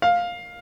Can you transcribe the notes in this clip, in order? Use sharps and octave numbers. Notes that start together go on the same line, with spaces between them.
F5